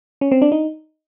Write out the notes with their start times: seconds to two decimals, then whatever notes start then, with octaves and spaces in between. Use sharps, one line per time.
0.21 C#4
0.31 C4
0.42 D4
0.52 D#4